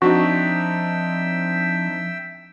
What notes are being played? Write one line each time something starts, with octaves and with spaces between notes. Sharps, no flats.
F3 C4 D4 D#4 F#4 E5 G5 E6